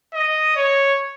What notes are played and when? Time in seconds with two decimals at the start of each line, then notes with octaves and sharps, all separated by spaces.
0.14 D#5
0.56 C#5